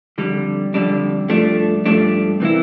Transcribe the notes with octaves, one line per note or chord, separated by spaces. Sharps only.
F2 D3 G3 D4
F2 D3 G3 D4
G2 F3 A3 D4
G2 F3 A3 D4
C3 E3 A#3 E4